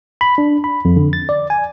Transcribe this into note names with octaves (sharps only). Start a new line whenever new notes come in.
B5
D4
B5
F2
D3
A6
D5
G#5